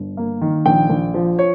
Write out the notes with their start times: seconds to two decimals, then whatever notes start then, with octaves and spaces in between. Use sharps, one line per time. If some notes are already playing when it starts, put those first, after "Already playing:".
Already playing: G1
0.17 A#3
0.41 D#3
0.66 A#1 G5
0.90 A#1
1.14 F3
1.39 C#5